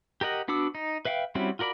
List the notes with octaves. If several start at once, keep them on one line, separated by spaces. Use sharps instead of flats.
G4 A#4 D#5 F#5
B3 D4 F#4 D6 E6
D#4
B4 E5 F5 G5
G3 C4 C#4 E4 F#4
F4 F#4 A#4 D5 B5